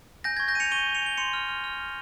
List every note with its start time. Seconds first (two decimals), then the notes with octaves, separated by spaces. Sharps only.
0.24 G#5 G6 A#6
0.37 C#6 G#6
0.48 G6 A#6
0.55 G#5 C#7 D#7 F7
0.71 C#6 D#7 G7
0.87 C#6
0.95 C#7 F7
1.02 G#5 G7
1.18 C6 C#7 F7
1.33 F6
1.48 F6
1.64 F6
1.80 F6